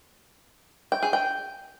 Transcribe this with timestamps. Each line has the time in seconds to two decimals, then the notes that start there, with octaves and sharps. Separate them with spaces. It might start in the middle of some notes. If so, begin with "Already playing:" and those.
0.92 G5
1.03 G#4
1.13 G5